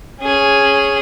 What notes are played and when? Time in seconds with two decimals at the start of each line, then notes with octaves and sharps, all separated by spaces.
0.20 C#4 G#4